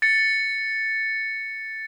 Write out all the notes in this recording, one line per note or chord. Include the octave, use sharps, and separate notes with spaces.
A6 C#7